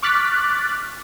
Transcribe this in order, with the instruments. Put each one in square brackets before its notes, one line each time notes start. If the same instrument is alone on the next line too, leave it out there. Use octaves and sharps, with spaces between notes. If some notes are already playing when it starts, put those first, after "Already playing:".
[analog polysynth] C#6 D6 F6 F#6 A6 B6